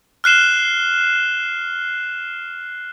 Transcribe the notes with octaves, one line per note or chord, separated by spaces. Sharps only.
F6 F#6 C7 E7 G7